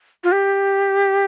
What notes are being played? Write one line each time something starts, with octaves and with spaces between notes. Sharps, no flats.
F4
G4